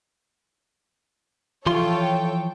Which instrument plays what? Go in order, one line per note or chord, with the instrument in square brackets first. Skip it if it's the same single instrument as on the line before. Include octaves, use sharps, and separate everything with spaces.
[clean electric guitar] E3 F3 C6 [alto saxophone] F4 [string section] A4 C#5 G5